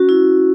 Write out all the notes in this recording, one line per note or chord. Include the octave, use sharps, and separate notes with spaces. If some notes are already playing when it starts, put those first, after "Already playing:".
Already playing: C#4 F#4
E4